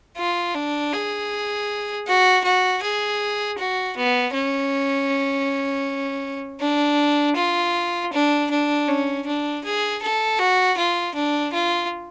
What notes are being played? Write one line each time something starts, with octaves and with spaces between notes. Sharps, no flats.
F4
D4
G#4
F#4
F#4
G#4
F#4
B3
C#4
D4
F4
D4
D4
C#4
D4
G#4
A4
F#4
F4
D4
F4